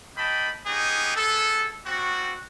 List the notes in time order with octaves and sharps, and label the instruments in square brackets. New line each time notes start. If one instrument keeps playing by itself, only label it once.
[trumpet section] A#3 D#5 G5 A5 B5
B3 C#4 D#4 G4 G#4
B3 G#4 A4
G3 C4 F#4